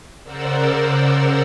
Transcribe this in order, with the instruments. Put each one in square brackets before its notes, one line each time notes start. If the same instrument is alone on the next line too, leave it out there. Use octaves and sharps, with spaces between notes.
[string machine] C#3 A#4 C5 D5 F#5 E6